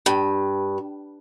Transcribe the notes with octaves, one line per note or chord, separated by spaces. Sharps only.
G2